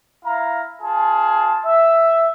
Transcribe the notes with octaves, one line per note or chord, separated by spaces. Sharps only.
E4 F5 A#5
F4 G#4 A5
E5